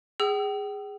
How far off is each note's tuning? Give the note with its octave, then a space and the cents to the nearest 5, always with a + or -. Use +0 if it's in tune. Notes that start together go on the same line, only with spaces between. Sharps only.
G#4 -15 G5 -40 E6 +20